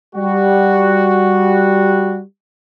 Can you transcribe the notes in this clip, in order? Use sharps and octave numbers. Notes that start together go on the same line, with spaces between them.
G3 F#4